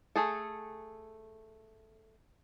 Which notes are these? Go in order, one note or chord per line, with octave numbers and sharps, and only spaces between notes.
A3 G#4 A4